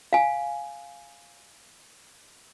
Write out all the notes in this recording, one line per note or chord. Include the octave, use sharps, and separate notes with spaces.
F5 G#5